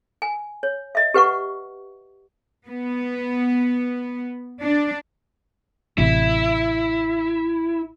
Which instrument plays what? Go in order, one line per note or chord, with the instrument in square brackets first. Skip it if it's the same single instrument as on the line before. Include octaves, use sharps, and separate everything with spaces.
[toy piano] G#5
C#5
D#5 E5
G4 B4 F#5 C#6
[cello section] B3
D4
[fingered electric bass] A1 C3 [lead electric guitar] E4